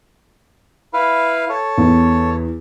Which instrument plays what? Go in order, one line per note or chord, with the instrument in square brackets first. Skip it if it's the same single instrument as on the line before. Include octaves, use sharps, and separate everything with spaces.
[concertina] E4 B4 F5
A4 C#5
[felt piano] E2